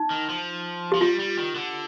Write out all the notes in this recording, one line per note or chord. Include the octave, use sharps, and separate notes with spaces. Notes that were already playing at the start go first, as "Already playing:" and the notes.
Already playing: D#4
D#3
F3
F3 G4
G3 F4
G3
D#3
D3